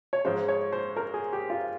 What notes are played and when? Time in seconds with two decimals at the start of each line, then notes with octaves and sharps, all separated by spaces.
0.13 C#5
0.25 G#2 F3 G#3 C5
0.48 C#5
0.72 C5
0.96 A#4
1.14 G#4
1.33 G4
1.50 F4